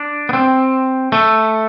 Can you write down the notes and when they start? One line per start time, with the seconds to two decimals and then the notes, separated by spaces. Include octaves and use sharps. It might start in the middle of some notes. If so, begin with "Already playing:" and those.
Already playing: D4
0.29 B3
0.33 C4
1.12 A3